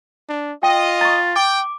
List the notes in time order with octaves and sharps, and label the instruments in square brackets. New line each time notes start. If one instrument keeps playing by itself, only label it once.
[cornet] D4
[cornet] F4 [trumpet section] D#5 [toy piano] G5
[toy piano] A#5 C#6 [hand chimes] A6
[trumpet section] G5 [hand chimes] D6